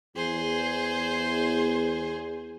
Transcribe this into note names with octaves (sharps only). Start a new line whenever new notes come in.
E2 G#4 C5